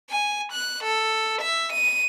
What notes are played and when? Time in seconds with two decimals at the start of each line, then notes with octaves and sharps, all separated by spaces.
0.10 G#5
0.52 F#6
0.84 A4
1.41 E5
1.72 D#7